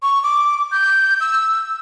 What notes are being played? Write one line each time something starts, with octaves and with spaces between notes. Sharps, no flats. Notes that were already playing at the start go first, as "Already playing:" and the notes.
C#6
D6
G6
E6